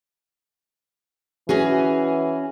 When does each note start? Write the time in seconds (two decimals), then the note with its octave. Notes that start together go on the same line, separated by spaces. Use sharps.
1.49 E3 C#4 F#4 G#4